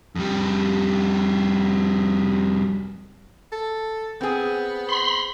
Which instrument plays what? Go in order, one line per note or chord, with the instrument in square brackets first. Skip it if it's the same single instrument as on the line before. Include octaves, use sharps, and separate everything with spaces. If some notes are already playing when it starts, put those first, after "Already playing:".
[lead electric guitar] F2 G3
[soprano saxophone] A4
[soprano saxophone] B3 [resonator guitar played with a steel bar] C4 G#4
[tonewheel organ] B5 C6